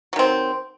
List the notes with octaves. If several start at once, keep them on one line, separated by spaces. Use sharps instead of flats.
D#3 F#3 C4